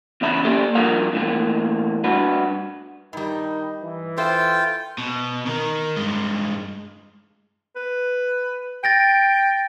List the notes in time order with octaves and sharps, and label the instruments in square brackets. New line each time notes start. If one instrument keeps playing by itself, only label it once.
[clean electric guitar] E2 C#3 E5 A#5 B5
A#3 G4 A4
G2 F3 A#3 A#4 F5
E2 A2 A#3
G2 F#4 B4
[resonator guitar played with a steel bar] G2 G3 [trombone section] D#3 D#4
[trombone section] E3
[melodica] F4 G5 [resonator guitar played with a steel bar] A4 C5 E5
[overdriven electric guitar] B2
D#3 A#4
G2 G#3
[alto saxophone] B4
[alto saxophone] G5 [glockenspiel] A6 A#6 D7